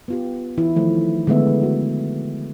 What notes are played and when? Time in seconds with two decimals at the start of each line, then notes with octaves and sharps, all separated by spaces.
0.08 B3 F4 G4
0.58 E3 E4
0.76 D#3 F3 A3
1.27 D3 G#3 A3 B3 E5
1.63 F#4